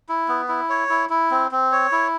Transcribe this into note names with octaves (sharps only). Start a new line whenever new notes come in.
E4
B3
E4
C#5
E4
E4
C4
C4
C#5
E4